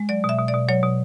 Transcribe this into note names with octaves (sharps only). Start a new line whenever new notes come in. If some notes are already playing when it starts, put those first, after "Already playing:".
Already playing: G#3
F#3 D5
B2
E5
B2
D5
B2
F#3 C#5
B2